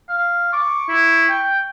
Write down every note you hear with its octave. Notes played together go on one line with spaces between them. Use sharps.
F5
C#6 D6
E4
G5